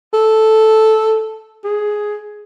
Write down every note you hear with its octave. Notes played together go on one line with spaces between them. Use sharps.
A4
G#4